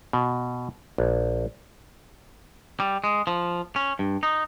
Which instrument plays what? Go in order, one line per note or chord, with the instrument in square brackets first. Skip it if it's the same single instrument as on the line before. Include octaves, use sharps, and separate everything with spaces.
[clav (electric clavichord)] B2
A#1
[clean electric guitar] G3
G#3
F3
C#4
G2
D#4